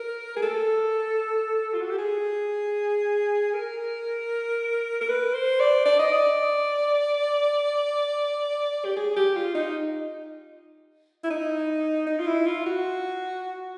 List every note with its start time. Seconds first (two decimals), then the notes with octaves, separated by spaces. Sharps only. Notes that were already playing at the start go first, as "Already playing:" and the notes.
Already playing: A#4
0.37 G#4
0.42 A4
1.74 F4
1.81 F#4
1.90 G4
1.98 G#4
3.54 A#4
5.01 A#4
5.09 B4
5.34 C5
5.60 D5
5.86 D5
5.99 D#5
6.12 D5
8.85 G4
8.97 G#4
9.16 G4
9.36 F4
9.55 D#4
11.24 E4
11.30 D#4
12.07 D#4
12.20 F4
12.27 E4
12.46 F4
12.66 F#4